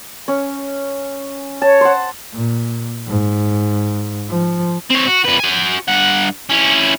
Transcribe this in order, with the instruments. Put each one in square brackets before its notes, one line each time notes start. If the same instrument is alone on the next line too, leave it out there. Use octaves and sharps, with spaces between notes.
[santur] C#4
[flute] C#5 [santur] A5
[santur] C5 F#5
[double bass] A#2
G#2
F3
[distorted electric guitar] C4 C#5
F#4
F2 B4
F#4 G#5
G2 F#5
C#4 E4